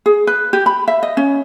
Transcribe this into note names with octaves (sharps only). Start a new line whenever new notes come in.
G#4
B4
G4
B5
E5
D#5
C#4